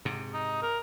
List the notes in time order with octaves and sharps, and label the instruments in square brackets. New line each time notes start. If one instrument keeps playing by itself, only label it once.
[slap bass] G#2 C3
[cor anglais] D#4
A#4